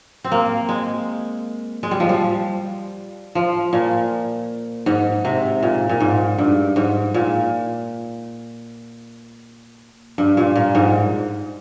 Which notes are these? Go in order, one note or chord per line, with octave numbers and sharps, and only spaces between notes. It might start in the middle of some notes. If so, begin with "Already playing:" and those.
C4
A#3
G#3
G#3
G3
F3
G3
F3
A#2
G#2
C3
A#2
A#2
G#2
G2
G#2
A#2
G2
A#2
A#2
G#2